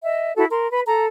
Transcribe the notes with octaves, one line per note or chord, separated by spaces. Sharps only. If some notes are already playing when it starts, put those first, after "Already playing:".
D#5 E5
E4 F#4 A4
A#4 C6
B4 B5
A4 A#5